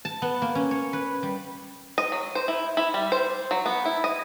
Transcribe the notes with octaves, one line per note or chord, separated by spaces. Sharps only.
A5
B3
A#3
C#4
C#5
B4
G3
D#5
F#3
C5
E4
E4
G3
C5
F#3
B3
E4
D#5